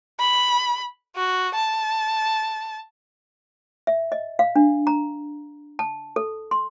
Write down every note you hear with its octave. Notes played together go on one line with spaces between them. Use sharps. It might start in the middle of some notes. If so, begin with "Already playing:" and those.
B5
F#4
A5
E5
D#5
F5
D4
A#5
A5
A4
C6